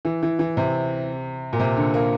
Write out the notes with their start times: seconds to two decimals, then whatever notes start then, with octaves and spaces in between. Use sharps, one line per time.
0.05 E3
0.23 E3
0.39 E3
0.57 C3
1.53 A#2
1.60 C3
1.77 D3
1.94 A#3